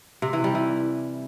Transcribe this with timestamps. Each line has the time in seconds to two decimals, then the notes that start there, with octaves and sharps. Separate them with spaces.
0.22 C3
0.33 E3
0.44 G3
0.55 E3